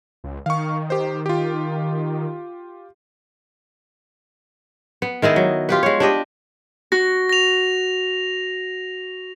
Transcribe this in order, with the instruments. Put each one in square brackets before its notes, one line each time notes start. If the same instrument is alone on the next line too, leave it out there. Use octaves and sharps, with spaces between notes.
[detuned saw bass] C#2
[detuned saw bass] D#3 [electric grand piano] F5 C#6
[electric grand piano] G4 C5
F4 G4
[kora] B3
D#3 G#3 E4 D#5
F#3
F4 G4 B4
G#3 C#5
D4 G4 D#5
[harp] F#4 [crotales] A#6
[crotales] A#6 F7